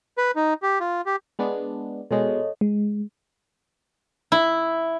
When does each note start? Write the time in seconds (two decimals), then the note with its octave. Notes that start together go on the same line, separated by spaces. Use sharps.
0.18 B4
0.36 D#4
0.62 G4
0.80 F4
1.06 G4
1.39 G#3 B3 D4
2.11 B2 G#3 A4 C#5 D#5
2.61 G#3
4.32 E4